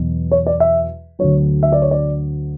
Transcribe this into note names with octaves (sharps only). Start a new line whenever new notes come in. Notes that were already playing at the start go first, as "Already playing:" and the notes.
Already playing: E2 B2 F#3
C#5
D5
E5
D2 D3 F#3 C#5
E5
D5
C#5
D5